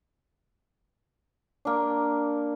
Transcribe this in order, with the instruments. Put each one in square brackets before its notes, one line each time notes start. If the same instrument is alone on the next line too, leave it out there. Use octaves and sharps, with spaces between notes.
[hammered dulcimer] A#3 D4